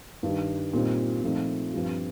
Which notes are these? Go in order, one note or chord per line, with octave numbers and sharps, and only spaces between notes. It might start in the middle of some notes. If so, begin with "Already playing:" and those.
G2 D#3 G3
A#2 G3 C4 D#4
A#2 F3 A3 C4 D#4
G2 F3 C4 G4